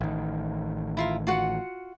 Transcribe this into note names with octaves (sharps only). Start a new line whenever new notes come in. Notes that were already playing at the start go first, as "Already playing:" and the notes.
A1 D#3
E4 F4 A#4
F4 F#4 F#5